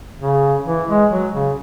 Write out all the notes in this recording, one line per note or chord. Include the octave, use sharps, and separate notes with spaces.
C#3
E3
G#3
F#3
C#3